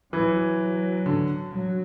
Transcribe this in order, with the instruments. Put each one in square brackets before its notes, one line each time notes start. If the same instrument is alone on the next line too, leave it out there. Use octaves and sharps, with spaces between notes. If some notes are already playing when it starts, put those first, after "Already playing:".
[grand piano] E3 [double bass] F#3
[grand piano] D3
[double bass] F#3